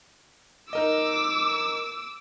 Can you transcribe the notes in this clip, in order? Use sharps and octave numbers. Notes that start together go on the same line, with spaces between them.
D#4 A#4 D#5 D6 E6